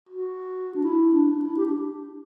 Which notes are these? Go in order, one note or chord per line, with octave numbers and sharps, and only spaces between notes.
F#4
D4
E4
D4
D4
E4
G4
D4